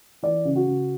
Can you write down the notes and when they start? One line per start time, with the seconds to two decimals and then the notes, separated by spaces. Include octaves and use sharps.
0.23 E3 D5
0.45 C#3
0.56 F#4
0.67 C#3